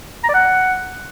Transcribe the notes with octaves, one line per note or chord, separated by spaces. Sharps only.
A#5
D5
F#5